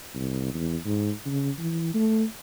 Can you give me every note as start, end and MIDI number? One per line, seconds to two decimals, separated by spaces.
0.15 0.49 36
0.54 0.76 40
0.85 1.11 44
1.26 1.50 49
1.59 1.92 52
1.94 2.23 57